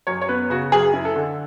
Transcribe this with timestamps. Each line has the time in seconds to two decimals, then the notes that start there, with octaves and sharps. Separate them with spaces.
0.07 F#2 C#5
0.22 C#5
0.29 B3 B4
0.50 C#3 F#4
0.72 F#2 G#4
0.93 E4
1.05 A4
1.16 D3